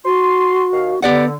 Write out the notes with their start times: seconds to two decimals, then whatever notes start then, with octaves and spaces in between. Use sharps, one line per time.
0.05 F#4 C6
0.72 D#2 D#3 F5
1.02 D3 B3 G4 D5 F#5